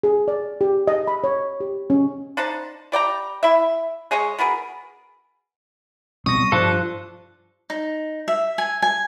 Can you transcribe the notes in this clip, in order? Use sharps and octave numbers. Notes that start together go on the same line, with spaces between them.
G#4
D5
G4
D#5
B5
C#5
G4
C#4
D4 D#4 C5 A5
G3 D5 G5 A#5
E4 E5
G#3 G#4 C#5 D#5
B2 B3 G#4 A#4
B2 G3 C4 C#6 D#6 A#6
G2 F3 D4 A4 C6 F#6
D#4
E5
G#5
G#5